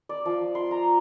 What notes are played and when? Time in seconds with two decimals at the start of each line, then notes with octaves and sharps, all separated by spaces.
0.09 D5
0.26 F3
0.55 C6
0.71 A#5